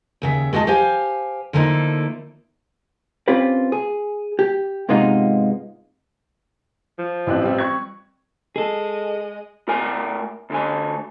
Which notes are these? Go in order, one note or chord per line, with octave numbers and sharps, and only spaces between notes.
D#2 C#3 E5
G#3 F#4 D#5 F#5 A5
G4 C5 F5 G#5
D3 F3 A3 A#3 D#4 E4
C4 C#4 F4 G4 B4 C5
G#4
G4
G#2 C3 G#3 B3 D#4 F4
F3
A1 E3 C4 D4 F#6
G3 C4
C#6 G#6
G#3 G#4 A4 D#5
A2 A#4 G#5
D2 D3 G#5